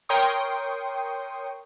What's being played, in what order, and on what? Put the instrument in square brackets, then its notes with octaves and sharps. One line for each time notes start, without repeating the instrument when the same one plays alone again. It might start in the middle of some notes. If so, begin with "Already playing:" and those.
[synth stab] A#4 C#5 G5 C6 C#6 D#6